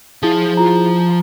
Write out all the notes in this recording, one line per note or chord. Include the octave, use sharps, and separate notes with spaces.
F3 E4 G#4 A5
F4 A#5